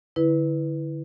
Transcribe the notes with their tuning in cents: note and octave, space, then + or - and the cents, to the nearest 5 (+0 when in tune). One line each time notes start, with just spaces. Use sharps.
D3 +0 E4 -10 B4 +0